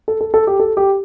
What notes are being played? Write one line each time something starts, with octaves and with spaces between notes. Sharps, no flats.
A4
A4
A4
G4
A4
G4